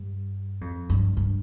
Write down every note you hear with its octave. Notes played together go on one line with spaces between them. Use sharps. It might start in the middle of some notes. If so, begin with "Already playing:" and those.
Already playing: G2
F2
G2
G2